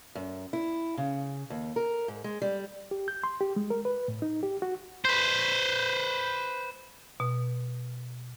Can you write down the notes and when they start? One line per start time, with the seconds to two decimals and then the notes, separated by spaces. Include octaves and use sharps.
0.15 F#2
0.53 E4
0.97 C#3
1.50 D#2
1.76 A#4
2.08 G#2
2.24 G#3
2.42 G3
2.91 G4
3.08 G6
3.24 C6
3.41 G4
3.56 G#3
3.70 A#4
3.85 B4
4.08 A2
4.22 D#4
4.43 G4
4.62 F#4
5.05 B4 C5
7.20 B2